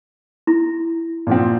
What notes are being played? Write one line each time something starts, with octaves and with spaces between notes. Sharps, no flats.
E4
A#2 F3 C4